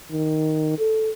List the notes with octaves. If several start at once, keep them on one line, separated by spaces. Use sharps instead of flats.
D#3
A4